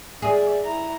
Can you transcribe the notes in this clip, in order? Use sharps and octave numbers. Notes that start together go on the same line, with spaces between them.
G#4 D5 E5
E4 A#5